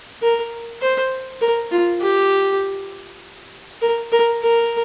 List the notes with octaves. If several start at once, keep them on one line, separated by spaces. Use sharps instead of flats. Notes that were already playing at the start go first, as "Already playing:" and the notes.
A#4
C5
A#4
F4
G4
A#4
A#4
A#4